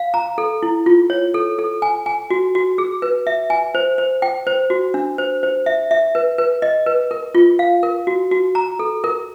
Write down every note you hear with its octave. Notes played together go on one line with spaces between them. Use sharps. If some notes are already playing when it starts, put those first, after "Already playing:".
Already playing: F5
A#5
A4
E4
F4
C#5
A4
A4
G#5
G#5
F#4
F#4
G#4
B4
E5
G#5
C5
C5
G5
C5
F#4
D4
C5
C5
E5
E5
B4
B4
D#5
B4
A#4
F4
F5
A#4
F#4
F#4
A#5
A4
A#4